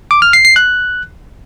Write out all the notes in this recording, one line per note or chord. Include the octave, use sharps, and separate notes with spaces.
D6
F6
C7
C7
F#6